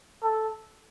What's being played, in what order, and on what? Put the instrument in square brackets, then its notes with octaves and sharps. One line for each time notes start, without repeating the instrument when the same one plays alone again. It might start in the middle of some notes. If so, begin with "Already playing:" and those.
[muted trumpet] A4